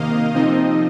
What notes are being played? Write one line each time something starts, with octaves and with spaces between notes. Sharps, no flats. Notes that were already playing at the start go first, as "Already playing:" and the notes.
Already playing: C3 D#3 A#3 D#5 F5
C3 F3 C4 D#4 D#5